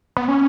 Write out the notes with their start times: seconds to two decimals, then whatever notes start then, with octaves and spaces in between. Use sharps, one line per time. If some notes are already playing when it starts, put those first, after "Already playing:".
0.17 B3
0.28 C#4